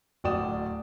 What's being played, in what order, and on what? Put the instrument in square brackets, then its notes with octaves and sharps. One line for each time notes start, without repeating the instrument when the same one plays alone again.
[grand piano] D1 F#4 D5 G5 D#6 E7